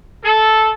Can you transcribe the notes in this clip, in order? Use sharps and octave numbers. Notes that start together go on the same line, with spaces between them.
A4